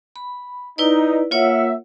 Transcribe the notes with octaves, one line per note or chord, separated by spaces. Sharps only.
B5
D#4 E4 B4 D5
A#3 F4 C#5 E5 F#5